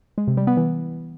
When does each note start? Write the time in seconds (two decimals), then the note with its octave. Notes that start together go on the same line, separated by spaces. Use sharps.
0.18 G#3
0.28 C3
0.37 G3
0.47 B3
0.57 E3